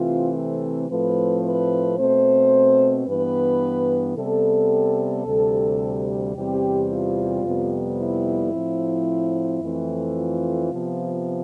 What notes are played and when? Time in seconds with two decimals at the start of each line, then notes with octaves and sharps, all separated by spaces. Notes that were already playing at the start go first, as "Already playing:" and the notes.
Already playing: C3 E3 A3 C4 F4
0.34 A4
0.88 A2 F3 A3 C4 B4
1.44 B4
1.97 B2 A3 C4 C5
3.06 G2 E3 B3 B4
4.16 C3 G3 B3 A4
5.26 D2 C3 G3
6.35 E2 C3 G3 C4 G4
6.90 F4
7.44 F2 C3 G3 B3
7.98 E4
8.53 A2 F3 C4
9.61 F2 E3 A3 C4
10.16 F4
10.71 C3 F3 B3